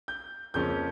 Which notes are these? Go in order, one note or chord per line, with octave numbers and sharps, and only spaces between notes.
G6
F2 C#3 F3 A#3 C#4 G6